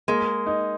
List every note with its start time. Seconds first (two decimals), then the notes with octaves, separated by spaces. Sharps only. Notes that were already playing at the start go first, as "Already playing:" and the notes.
0.08 G#3 A#3
0.46 D#4